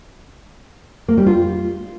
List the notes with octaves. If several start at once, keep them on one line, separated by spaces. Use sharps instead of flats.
A#3
G3
F4